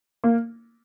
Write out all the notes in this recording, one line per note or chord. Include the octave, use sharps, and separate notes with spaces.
A#3